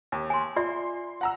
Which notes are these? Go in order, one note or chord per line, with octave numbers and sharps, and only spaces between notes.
D#2
G#5 C6
F4 D5 E5 C6
F#5 A#5 E6